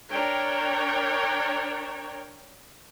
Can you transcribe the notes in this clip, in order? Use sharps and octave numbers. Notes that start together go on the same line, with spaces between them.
D4 A#4 C#5 G5